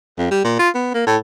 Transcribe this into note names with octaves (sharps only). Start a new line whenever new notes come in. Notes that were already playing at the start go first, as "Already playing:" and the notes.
F2
G3
A#2
F4
B3
A#3
A2